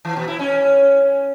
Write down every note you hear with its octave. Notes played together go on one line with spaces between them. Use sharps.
E3
B2
E4
C#4